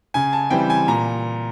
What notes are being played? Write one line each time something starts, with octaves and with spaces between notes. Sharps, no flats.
C#3 G#5
A5
E3 G3 C4 G5
G#5
A#2 A#5